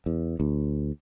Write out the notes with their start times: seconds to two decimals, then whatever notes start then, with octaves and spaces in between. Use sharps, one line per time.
0.06 E2
0.40 D2